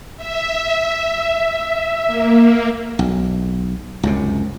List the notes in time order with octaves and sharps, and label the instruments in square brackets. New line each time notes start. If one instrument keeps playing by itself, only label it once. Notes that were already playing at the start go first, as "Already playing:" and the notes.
[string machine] E5
A#3
[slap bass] B1
C#2 F#2 C3